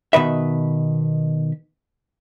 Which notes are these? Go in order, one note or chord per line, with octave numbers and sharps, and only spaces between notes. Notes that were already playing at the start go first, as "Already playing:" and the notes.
B2 D#3 B4 E5